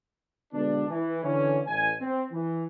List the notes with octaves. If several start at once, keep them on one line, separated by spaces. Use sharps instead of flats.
B2 D3 G#3 B3 D4
E3
D3 E3 C#4
A1 G#5
C4
E3